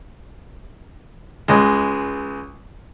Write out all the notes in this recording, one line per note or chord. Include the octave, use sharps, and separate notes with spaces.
C#2 G#3